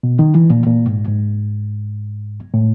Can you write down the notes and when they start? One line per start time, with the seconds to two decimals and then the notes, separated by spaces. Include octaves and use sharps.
0.03 B2
0.19 D#3
0.35 E3
0.50 A#2
0.66 A#2
0.87 G#2
1.08 G#2
2.54 A2